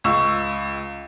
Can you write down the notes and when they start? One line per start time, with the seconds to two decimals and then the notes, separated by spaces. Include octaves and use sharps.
0.04 C#2 C#6 E6